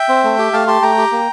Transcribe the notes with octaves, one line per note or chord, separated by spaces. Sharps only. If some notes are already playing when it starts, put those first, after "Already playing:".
Already playing: E5 G5
C4
A3
G4
A3 F5 A5
G4 A5 C6
A3 G5 A#5
G4
A#3